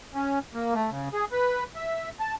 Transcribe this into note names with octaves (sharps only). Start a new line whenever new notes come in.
C#4
A#3
A3
C#3
G#4
B4
E5
A5